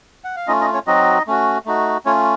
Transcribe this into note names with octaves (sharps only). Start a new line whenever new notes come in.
F#5
F5
A3 C#4 D#4 F4 D#5
D#4 D#5
C#4 C#5
F#3 C4 D#4 F#4 D#5
A3 C#4 F#4
A3 D#4 F#4
A3 C#4 F4 C#5